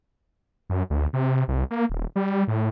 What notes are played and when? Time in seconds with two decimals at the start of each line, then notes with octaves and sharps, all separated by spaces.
0.70 F#2
0.90 D2
1.13 C3
1.48 C2
1.71 A#3
1.90 D#1
2.16 G3
2.48 A2